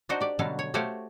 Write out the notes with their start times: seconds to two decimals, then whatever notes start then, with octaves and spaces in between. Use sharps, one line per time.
0.09 D4 D#4 F#4 C5
0.21 G4 D5
0.39 B2 D3 F#3 G3 A4 F5
0.59 C#5
0.74 A3 F#4 G4 C5 C#5 F5